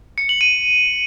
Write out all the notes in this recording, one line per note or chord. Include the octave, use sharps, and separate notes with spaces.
C#7
F#7
D#7